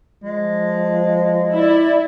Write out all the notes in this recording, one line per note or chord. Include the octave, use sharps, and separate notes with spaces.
F3 G#3
E4 D5